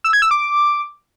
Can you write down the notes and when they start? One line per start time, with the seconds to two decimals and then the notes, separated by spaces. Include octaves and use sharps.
0.04 E6
0.13 G#6
0.22 E6
0.31 D6